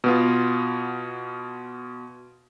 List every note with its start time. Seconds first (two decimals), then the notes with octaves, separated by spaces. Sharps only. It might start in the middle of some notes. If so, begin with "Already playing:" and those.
0.04 B2 B3 F4